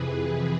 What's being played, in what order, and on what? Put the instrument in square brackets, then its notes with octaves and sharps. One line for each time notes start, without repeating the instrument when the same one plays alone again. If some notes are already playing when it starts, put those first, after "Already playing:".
Already playing: [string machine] F2 C3 E3 G#4 B4